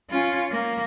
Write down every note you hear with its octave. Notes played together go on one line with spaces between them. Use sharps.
C#4 F4
A#3